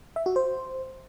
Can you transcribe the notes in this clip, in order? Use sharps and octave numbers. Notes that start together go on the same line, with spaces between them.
E5
F#4
C5